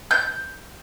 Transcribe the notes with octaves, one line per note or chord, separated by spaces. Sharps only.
G6